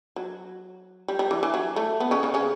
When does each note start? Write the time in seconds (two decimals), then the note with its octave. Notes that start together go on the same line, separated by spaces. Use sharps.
0.16 F#3
1.08 G3
1.19 G3
1.31 E3
1.43 E3
1.54 F#3
1.76 A3
2.00 B3
2.11 C#3 C#4
2.23 C#3 C#4
2.34 C#3 C#4